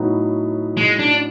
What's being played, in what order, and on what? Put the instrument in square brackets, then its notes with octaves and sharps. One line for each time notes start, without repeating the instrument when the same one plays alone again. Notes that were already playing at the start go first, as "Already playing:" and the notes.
Already playing: [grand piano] A2 F#3 B3 D#4 F#4
[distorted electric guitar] G#3
D4